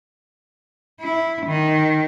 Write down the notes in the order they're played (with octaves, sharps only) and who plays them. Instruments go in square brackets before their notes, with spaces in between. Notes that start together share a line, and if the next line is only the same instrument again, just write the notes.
[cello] E4
D#3